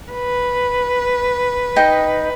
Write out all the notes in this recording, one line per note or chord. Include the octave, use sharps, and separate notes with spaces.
B4
D#4 D#5 G5